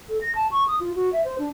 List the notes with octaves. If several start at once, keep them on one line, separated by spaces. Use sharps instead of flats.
A4
A#6
A5
C#6
D#6
F4
F#4
E5
C5
D4